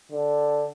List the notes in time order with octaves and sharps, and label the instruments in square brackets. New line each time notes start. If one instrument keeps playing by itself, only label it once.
[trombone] D3